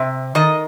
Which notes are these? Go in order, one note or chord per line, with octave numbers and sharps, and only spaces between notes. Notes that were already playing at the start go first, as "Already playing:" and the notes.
Already playing: C3 E5
D#3 D#5